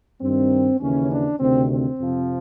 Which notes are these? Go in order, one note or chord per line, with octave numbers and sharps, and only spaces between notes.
G2 D#3 C4
D#2 C#3 E3 C#4
D4
D2 C3 D#3 C4
C4
F2 C3 F3